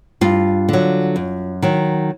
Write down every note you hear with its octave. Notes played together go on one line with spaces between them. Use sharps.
G2 F4
D3 F#3
F#2
D#3 F#3